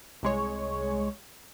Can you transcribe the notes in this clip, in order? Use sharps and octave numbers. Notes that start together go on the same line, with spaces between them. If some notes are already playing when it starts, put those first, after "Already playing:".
C2 G#3 C#5